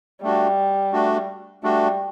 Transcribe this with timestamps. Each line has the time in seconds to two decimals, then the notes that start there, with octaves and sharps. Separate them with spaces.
0.22 G3 A3 D4 F#4
0.93 A3 D4 F#4
1.63 G3 A3 D4 F#4